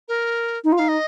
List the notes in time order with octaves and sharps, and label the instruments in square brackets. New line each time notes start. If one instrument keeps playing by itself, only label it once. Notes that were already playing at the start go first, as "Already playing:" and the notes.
[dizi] A#4
[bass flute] D#4
F4
[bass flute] D#4 [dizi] F5
[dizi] D#5